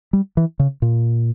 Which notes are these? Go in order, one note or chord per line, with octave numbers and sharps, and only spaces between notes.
G3
E3
C#3
A#2